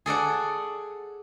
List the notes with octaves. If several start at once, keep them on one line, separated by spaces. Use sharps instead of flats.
G#4 A4 D5 F#5